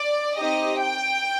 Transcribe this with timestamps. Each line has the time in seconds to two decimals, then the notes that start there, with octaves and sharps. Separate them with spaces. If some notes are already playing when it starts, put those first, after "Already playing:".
Already playing: D5
0.39 C4 D#4 G4 D#5
0.81 G5